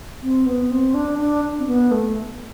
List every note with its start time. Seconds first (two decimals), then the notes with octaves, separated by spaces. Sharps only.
0.22 C4
0.46 B3
0.71 C4
0.94 D4
1.19 D4
1.59 C4
1.66 B3
1.91 A3